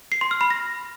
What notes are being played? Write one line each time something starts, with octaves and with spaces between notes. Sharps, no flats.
C7
C6
F6
B5
A#6